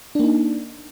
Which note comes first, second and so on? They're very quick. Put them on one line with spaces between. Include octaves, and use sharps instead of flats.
D4 A#3 D#4